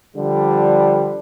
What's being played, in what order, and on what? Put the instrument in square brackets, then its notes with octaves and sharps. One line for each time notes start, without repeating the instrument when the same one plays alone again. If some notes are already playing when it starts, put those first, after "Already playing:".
[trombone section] D3 F3 G3